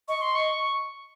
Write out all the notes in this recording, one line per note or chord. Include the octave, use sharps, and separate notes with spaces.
D#5 C#6
C6
C#6